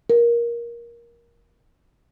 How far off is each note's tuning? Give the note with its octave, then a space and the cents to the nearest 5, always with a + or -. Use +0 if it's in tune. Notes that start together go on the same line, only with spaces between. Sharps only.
A#4 +15